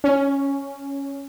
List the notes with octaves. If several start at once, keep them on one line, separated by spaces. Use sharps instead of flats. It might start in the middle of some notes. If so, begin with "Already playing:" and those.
C#4